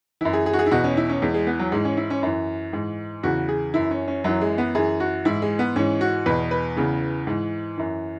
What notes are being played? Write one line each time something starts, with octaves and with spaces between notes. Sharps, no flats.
F#2 E3 E4
G#4
G#4
F#4
G#4
E4
E2 B2 F#4
C#4
E4
C#4
E2 E3 G#3
G#3
B3
F#3
G#2 E3 G#3
C#4
E4
C#4
F#2 E3
G#2 E3
E2 C#3 E3 F#4
G#4
F#2 E3 E4
C#4
C#4
F#2 E3 F#3
G#3
B3
F#2 E3 G#4
F#4
G#2 E3 E4
G#3
B3
G#2 E3 C#4
F#4
E2 B2 B4
B4
E2 C#3 E3
G#2 E3
F#2 E3